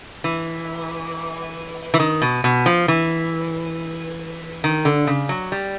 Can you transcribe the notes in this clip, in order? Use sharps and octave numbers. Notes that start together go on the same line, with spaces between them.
E3
E3
D#3
B2
B2
F3
E3
D#3
D3
C#3
F#3
G3